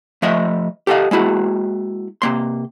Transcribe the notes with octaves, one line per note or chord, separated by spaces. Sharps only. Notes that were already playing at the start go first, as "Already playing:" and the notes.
F3 A3 D#5 E5
G4 A4 D#5 F5
G#3 A#3 E4 F#4
C3 A#3 C6